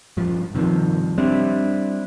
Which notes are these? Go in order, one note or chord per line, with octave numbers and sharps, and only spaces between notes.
G2 F3
G2 C3 D#3 F3
G3 C4 D4 E4